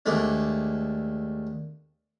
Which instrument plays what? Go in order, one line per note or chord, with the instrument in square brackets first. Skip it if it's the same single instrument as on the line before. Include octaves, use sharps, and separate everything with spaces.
[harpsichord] D#2 G#3 A3 D4